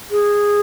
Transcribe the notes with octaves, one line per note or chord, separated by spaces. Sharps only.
G#4